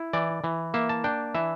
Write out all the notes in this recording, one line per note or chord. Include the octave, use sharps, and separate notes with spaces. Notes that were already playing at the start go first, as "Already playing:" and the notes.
Already playing: E4
E3 D5
E3
A#3 E5
A5
D4 G5
E3 E5